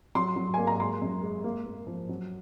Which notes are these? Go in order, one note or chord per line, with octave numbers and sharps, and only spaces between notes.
F#3 C6
F#3
A#3 G#5
A#5
G#3 C6
F#2
G#3
A#3
A#3
F3
F#3